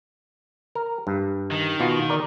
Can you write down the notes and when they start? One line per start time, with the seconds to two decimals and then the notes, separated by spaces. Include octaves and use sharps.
0.75 A#4
1.07 G2
1.52 D#3
1.80 B2 F4 F#4
2.10 A#4 D5